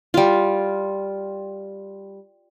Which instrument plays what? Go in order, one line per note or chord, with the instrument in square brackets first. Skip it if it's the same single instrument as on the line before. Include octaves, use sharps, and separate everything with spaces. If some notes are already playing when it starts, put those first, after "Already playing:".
[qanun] G3 F4